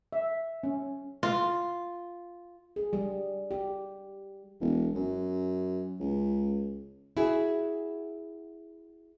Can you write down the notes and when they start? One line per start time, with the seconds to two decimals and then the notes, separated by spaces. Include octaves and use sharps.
0.13 E5
0.63 C#4
1.23 F4
2.76 G#4
2.93 G3
3.51 G4
4.61 E1
4.95 F#2
6.00 C#2
7.17 E4 F#4 G#4